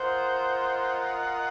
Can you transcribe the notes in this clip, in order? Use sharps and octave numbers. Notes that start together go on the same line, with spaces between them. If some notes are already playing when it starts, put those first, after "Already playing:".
Already playing: F4 A#4 C5 D#5 F#5